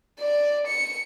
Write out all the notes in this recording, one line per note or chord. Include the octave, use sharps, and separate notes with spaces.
D5
C#7